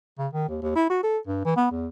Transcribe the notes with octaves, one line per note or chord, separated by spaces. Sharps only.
C#3
D#3
D#2
D#2
E4
F#4
A4
G2
E3
B3
E2